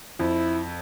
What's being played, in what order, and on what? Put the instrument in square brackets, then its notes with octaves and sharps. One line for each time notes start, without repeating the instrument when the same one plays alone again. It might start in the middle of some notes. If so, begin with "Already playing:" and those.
[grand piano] F2 [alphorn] E4